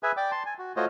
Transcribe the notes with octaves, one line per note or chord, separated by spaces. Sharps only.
G#4 B4 E5 G#5
D5 G5 D6
A5 C6
G#5
F#4
A3 F4 F#4 C5 C#5 D#5